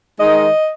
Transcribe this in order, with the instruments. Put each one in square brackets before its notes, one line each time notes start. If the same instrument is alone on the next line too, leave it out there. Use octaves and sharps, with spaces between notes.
[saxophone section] D#3 G#3 D#4 D#5